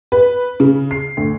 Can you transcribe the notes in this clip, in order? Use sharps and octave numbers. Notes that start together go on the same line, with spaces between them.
B4
C#3
C7
D2